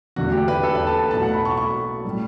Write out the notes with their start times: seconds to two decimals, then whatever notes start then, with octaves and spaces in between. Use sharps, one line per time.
0.16 E2 D3 A3 F#4
0.32 G4
0.48 B4
0.63 A4
0.75 B4
0.87 A5
0.98 A5
1.11 B1 A2 F#3 A5
1.22 F#5
1.34 B5
1.45 C#6
1.57 C#6
2.05 A2 G3